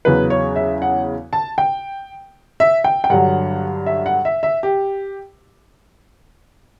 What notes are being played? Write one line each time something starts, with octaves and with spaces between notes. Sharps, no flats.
E2 C#3 F#3 B4
C#5
E5
F#5
A5
G5
E5
G5
G5
G2 D3 F#3 F#5
E5
F#5
E5
E5
G4